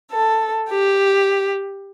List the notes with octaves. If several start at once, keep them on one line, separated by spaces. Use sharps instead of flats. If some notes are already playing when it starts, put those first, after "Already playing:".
A4
G4